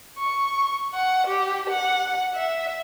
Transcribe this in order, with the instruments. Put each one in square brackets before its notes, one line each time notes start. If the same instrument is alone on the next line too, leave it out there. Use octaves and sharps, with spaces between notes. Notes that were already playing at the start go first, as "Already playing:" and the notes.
[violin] C#6
F#5
G4
F#5
E5